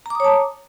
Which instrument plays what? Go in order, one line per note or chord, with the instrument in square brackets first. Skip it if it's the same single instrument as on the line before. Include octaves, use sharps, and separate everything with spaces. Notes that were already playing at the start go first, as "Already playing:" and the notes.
[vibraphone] A#5
D6
D#6
C#5
A5